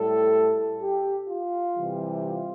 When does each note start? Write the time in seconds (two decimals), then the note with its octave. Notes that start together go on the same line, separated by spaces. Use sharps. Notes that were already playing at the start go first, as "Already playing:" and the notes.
Already playing: A2 G3 A4
0.81 G4
1.28 F4
1.76 C3 E3 G3
2.23 F4